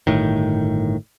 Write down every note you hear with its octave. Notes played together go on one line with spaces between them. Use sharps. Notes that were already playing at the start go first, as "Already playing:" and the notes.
G1 A2 D#3